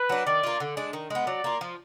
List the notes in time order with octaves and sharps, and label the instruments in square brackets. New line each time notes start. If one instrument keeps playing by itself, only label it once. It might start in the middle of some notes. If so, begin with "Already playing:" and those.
Already playing: [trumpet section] B4
[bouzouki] F#3 D4
[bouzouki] D#3 [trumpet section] D5
[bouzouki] A#3 F4
D3
G#3 D4
D#3
G#3 B3
[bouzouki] F#3 [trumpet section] D5
[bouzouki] A#3 F4
F3